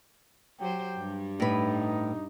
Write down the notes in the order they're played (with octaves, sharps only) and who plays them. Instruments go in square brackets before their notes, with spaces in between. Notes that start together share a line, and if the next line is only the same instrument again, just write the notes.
[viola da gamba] F#3 C5 [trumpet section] G4 G5
[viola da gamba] G2 G3
[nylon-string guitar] A2 B4 [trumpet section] D#4